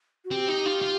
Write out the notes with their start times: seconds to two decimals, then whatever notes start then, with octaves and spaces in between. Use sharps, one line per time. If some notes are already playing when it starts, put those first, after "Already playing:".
0.25 F#4
0.31 C4 G4
0.48 D#4
0.66 F4
0.82 F4